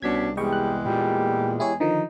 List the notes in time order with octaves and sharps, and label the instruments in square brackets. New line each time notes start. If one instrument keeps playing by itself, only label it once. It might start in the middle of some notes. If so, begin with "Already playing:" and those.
[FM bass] C2 [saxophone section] B2 C#4 D4 [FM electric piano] G#6 B6
[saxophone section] E2 G#3 [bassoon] G3 [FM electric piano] D#5 G5 C#6
[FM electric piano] F#6
[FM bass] A#2 [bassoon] G3
[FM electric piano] E4 G4 C#5 [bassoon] G#4
[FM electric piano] D3 D#3 F3 [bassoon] D#4